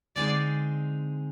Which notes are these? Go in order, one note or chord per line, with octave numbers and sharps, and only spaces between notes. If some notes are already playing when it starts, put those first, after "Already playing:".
D3 G#3 C4 D#4 G#4 D5